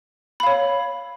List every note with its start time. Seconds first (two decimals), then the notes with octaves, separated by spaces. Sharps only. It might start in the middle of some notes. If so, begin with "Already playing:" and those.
0.40 B5
0.43 F5
0.47 C#5